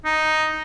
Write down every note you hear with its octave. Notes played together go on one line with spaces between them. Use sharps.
D#4